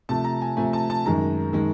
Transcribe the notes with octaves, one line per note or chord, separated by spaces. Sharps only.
C3 F3 A3 A5
A#5
G#5
C3 F3 A3 G#5
A5
A5
F#2 D#3 G#3 A#5
D#3 G#3